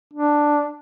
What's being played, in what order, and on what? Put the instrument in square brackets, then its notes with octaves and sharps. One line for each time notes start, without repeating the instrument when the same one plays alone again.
[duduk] D4